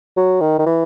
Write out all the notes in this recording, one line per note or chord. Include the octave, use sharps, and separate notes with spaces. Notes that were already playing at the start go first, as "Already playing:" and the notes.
F#3
D#3
D#3
E3